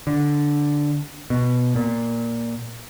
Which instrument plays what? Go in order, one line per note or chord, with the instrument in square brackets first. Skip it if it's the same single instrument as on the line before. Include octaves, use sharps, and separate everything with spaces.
[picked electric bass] D3
B2
A#2